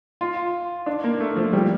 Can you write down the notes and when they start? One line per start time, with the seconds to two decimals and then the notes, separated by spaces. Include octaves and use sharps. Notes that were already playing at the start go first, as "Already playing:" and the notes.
0.21 F4
0.86 D4
1.04 A#3
1.20 A3
1.36 F3
1.53 G3